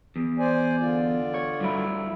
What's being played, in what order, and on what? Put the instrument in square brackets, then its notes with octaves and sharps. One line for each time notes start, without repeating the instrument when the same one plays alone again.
[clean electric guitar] E2
[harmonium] C5 D5 G#5
D3 F4 D5
[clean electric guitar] C#5
G2 F#3 E4